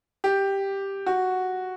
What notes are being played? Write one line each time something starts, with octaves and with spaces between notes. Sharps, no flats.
G4
F#4